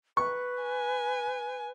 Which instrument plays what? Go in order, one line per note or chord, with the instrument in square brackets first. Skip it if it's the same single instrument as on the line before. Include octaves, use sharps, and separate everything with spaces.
[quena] B4 [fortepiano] C#6
[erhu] G#5